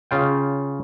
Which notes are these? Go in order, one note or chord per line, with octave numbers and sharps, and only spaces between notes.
C#3 F4 G5